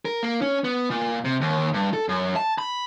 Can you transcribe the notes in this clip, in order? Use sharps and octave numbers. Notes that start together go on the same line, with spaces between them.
A#4
A#3
C#4
B3
A#2
C3
D#2
G2
A4
F#2
A5
B5